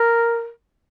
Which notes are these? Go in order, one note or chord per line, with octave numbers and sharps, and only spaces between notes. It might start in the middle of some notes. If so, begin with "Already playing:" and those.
Already playing: A#4